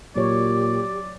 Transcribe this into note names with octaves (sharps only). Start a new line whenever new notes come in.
A#2 F#3 G4 C#5 D5